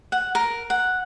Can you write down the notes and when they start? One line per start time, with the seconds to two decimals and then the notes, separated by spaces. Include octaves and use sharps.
0.12 F#5
0.35 A#4
0.70 F#5